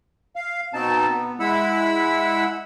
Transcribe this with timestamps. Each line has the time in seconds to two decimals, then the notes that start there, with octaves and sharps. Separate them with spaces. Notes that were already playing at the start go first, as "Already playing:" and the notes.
0.36 F5
0.74 B2 C4 D#4 A5
1.10 B3
1.40 G#3 E4 F#5 B5 E6